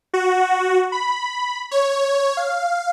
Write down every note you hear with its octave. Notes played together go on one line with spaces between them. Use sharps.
F#4
B5
C#5
F5